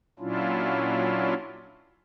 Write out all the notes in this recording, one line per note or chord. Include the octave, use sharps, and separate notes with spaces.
A#2 F#3 C#4 D4 E4 F4